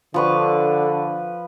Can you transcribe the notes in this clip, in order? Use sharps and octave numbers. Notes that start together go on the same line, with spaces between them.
D3 F3 B4 C#6